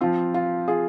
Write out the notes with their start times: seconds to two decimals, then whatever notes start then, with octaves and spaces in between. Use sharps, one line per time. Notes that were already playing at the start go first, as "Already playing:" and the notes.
0.01 F3 C4 F4
0.34 F4
0.68 F4 G#4